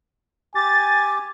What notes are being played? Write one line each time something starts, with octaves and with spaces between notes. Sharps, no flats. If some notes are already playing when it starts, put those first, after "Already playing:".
G4 G#5 A6